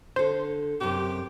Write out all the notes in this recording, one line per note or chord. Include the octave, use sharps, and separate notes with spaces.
D3 A4 C5
F#2 C3 G4